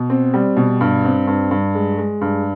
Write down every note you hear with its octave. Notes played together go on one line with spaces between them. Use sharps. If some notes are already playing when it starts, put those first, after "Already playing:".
Already playing: B2
C4
G3
B2
G2
C4
G2
G2
G#3
G#3
G2